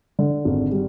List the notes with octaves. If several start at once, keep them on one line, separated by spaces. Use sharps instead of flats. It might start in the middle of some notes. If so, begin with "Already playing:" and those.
D3
G#1
G3